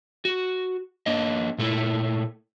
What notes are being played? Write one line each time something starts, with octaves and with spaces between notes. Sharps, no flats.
F#4
A#3 D4 D#5
A#2 A3 E4